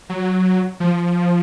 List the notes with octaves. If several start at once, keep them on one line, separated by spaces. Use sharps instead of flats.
F#3
F3